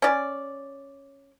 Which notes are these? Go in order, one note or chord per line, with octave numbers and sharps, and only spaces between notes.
C#4 D5